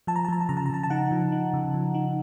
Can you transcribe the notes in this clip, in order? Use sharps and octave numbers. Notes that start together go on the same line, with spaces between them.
F3 A5
A#5
A5
F3 A#5
A5
C#3 A#5
A5
A#5
C#3 A5
A5
D#4 F#5
F3
D#4
C#3
F3
D#4